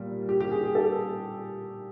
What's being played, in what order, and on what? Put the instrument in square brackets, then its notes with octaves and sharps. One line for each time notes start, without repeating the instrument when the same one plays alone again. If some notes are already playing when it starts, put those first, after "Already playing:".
Already playing: [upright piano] A#2 G3 A#3
G4
G4
G#4
G#4
A4